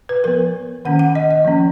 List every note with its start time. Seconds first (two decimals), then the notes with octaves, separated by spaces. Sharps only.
0.09 B4
0.24 F3 B3 A#4
0.85 D#3 A#3 C#4 F#5
0.99 F#5
1.15 D#5
1.31 D#5
1.45 F3 A#3 C#4